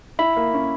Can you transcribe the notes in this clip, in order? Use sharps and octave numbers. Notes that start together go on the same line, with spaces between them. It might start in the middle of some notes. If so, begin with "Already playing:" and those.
E4 B5
A#3
C#4